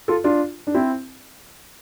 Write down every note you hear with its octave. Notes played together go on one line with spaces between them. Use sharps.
F4 A4
D4 F4
D4
C4 E4